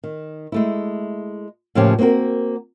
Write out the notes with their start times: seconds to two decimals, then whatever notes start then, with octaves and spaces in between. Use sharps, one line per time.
0.03 D#3
0.52 G#3 A3 E4
1.75 A2 C#3 F3 A#3 C#4 G4
1.99 A#3 C4 D#4 F#4 A#4